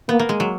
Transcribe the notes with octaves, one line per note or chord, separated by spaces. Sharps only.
A#3 B3
A#3
G#3
F#3